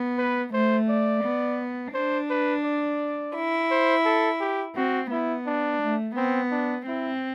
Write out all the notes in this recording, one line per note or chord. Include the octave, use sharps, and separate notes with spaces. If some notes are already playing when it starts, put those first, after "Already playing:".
Already playing: B3
B4
A3 C5
D5
B3
D4 C5
B4
D5
E4
C5
A4
G4
C4 F#4
B3 E4
D4
A3
B3 C4
D4
C4 E4